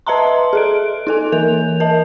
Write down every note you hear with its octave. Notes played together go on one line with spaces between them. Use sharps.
B4 D#5 E5 A5 A#5 C6
G#4 A4 D7
D#4 A4 G#5
E3 A#4 F7
A#4 D#5 A5